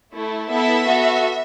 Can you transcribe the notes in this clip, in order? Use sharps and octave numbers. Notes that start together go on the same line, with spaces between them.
A3 E4 A4
B3 E4 A4 E5
B3 F#4 A4